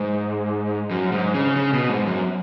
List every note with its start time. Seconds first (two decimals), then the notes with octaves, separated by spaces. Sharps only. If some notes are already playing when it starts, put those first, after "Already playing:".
Already playing: G#2
0.91 F#2
1.12 G#2
1.35 C#3
1.56 C#3
1.73 B2
1.90 G#2
2.07 F#2